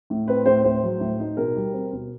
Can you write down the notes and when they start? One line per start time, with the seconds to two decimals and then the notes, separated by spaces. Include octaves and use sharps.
0.10 A2
0.27 C4 B4
0.46 A2 C5
0.64 A2 C5
0.83 F#3
1.00 A2
1.19 D#4
1.37 B2 A#4
1.55 G3
1.73 C4
1.93 B2